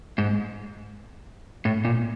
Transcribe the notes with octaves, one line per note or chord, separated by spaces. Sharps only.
G#2
A2
A#2